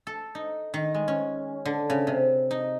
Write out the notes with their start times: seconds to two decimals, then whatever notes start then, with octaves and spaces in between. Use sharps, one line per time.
0.07 A4
0.35 D#4
0.74 D#3
0.94 G#3
1.08 C#4
1.65 D3
1.90 C#3
2.07 C3
2.51 D#4